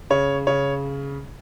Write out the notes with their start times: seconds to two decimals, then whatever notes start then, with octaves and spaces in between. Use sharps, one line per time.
0.10 C#3 C#5
0.47 C#3 C#5